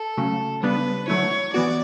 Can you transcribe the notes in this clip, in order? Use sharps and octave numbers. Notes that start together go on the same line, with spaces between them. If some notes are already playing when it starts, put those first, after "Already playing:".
Already playing: A4
C#3 F#3 A3 C#4
C#3 G3 B3 D4 B4
D3 F#3 A3 E4 C#5
E3 B3 F#4 D5